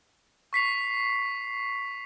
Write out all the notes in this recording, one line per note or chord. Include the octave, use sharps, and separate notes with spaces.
C#6 B6 C7 F7